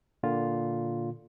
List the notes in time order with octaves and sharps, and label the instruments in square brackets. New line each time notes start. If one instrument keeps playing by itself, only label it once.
[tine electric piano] A#2 D3 F4